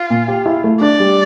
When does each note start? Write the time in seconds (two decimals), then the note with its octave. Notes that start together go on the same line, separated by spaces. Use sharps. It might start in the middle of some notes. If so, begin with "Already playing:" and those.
Already playing: F4
0.10 A#2
0.28 G4
0.46 E4
0.64 A3
0.81 D4 D5
1.00 G3